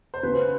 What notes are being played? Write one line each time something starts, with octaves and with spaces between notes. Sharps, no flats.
C5
C#3 B4